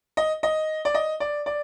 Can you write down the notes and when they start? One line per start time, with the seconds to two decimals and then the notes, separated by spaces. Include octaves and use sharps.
0.17 D#5
0.43 D#5
0.85 D5
0.94 D#5
1.20 D5
1.46 D5